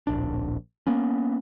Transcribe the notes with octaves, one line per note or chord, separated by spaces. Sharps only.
D1 A#1 D4
A#3 B3 C#4